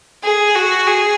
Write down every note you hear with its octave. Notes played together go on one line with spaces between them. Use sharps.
G#4
F#4
G#4